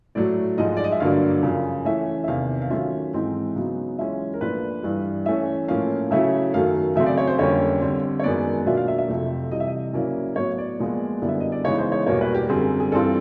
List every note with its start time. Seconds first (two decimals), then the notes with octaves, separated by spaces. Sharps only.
0.15 A2 F#3 A3 D5
0.57 G#2 F3 G#3 D#5
0.77 D5
0.84 D#5
0.92 E5
1.00 G2 D3 F#3 A#3 D4 F5
1.43 F#2 C#3 F3
1.85 E3 A3 C#4 E5
2.24 E5
2.28 E2 C3 D#3 F5
2.62 F5
2.70 D#3 F#3 A3 C#4 F4 E5
3.13 G#2 E3 G#3 C4 D#4
3.55 C#3 F#3 B3 D#4
3.99 E3 G#3 C#4 F4 E5
4.34 A#4
4.41 A#2 F3 A3 D4 F4 B4
4.83 G2 E3 G3
5.26 E3 A3 C#4 E5
5.68 A2 F3 A#3 C#4 F5
6.11 C#3 F#3 A3 C#4 E4 E5
6.54 F#2 D#3 F#3 A3 F5
6.96 C#3 F#3 A3 C4 E5
7.06 D5
7.18 C#5
7.27 C5
7.38 F2 D3 G3 A#3 C#4 C#5
7.82 D3 G3 C4
8.20 C#5
8.23 F#2 D#3 G#3 B3 D5
8.66 B2 F#3 A#3 D4 F4 E5
8.77 F5
8.88 E5
8.98 E5
9.08 F2 C3 F3 A3
9.51 C3 E3 G3 D#5
9.60 E5
9.68 D#5
9.93 C#3 F#3 A#3 C#4 E4 D5
10.36 A2 F#3 B3 C#5
10.58 D5
10.80 A#2 F3 G#3 B3
11.22 F#2 D3 G3 B3 E4
11.29 E5
11.40 D#5
11.52 D5
11.64 C#3 E3 G#3 B3 D#4 C#5
11.78 C5
11.92 C#5
12.07 E2 B2 G3 A#3 C#5
12.21 B4
12.34 G4
12.49 F#2 D3 G3 C4 G#4
12.80 G#4
12.92 G2 E3 G3 C4 F4 A4